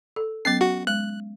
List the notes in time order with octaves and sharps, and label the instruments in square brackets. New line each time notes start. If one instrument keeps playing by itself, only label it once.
[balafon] A4
[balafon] F#3 B3 C#4 [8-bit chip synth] A6 C7
[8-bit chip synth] F#4
[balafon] G#3 [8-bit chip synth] F#6